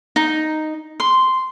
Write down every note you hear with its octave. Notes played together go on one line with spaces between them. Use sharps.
D#4
C6